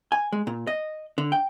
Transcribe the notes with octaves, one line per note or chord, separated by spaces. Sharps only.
G#5
G#3
A#2
D#5
D3
G5